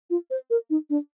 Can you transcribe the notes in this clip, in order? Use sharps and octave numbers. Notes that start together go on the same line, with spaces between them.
F4
C5
A#4
D#4
D4